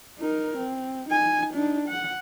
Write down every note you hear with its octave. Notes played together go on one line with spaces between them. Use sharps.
D#4 A#4
C4
D#4 G#5
D4 D#4
F#5